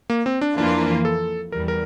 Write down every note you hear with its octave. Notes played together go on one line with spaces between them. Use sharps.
A#3
C4
D4
F2 E3 A#3 D4 F4
A4
E2 E3 G3 A#4
A#4